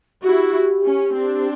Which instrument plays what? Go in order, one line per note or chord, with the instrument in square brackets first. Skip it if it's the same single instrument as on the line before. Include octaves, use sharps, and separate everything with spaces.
[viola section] E4 F#4 [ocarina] G4
[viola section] C#4
C4 D4